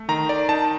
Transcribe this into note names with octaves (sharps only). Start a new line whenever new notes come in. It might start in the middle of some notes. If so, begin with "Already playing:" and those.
Already playing: A3
D#3 A#5
D5
D#4 A5